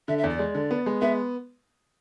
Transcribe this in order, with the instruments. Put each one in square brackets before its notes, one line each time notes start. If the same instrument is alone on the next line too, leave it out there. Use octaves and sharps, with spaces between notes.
[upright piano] D3 [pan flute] E5
[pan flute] E5
[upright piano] E2
[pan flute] D5
[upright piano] G#3
D3
B3
G#3
[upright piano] B3 [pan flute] E5